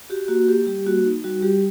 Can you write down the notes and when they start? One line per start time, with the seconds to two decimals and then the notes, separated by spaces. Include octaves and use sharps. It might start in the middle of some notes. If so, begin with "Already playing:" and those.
0.10 F#4 G4
0.28 A#3 F#4
0.48 A#3 G4
0.67 G3 G4
0.86 A#3 F#4
1.05 D#4
1.24 G3 F#4
1.42 G3 G4